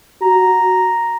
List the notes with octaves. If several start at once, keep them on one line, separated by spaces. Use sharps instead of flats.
F#4 A#5